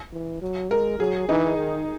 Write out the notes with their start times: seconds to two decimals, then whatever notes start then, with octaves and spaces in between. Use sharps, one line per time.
0.12 E3
0.42 F#3
0.70 G#3 A#4
0.99 F#3 G#4
1.29 E3 D#4
1.58 D#3